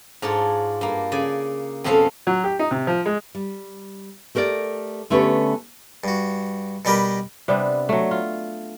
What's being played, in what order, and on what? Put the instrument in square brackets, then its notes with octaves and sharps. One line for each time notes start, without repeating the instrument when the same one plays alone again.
[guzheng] G#2 D4 F4 C#5
G2 A#3
C#3 D5 G#5
F2 B2 A3 C4 C#4 F5
[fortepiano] F#3
G4
D#4
C3
F3
G#3
[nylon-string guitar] G3
A3 G4 A#4 C5 D5
D3 A3 B3 C#4 G4 B4
[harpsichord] G2 F#4
B2 G3 G4 A#4 B4
[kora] C3 G3 B3 D4
F#3 A3
F4